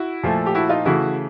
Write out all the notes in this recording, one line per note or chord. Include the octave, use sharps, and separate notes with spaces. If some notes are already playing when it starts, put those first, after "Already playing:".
Already playing: E4 F#4
A#2 F3 A3
G4
E4 F#4
D#4 F4
C#3 E3 A3 E4 F#4